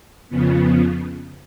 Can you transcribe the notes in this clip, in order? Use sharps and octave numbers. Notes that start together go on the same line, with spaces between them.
F2 C#3 F3 B3